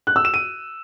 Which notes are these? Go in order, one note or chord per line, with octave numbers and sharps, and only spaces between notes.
F#6
E6
E7
D#7